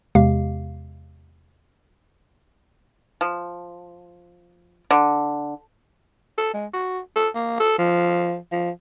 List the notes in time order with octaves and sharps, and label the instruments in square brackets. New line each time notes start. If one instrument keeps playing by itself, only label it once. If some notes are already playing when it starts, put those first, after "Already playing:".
[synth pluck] E2 C3 G#3 G4 F5
[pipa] F3
D3
[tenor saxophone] A4
G#3
F#4
A4
A#3
A4
F3
F3